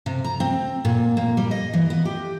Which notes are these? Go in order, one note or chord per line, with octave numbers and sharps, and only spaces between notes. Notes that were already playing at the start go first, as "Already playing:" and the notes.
C3
A#5
C4
A#2
A#3
G3
D#5
E3
B3
G4